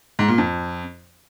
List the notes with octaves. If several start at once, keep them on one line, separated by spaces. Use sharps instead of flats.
G#2
A#2
F2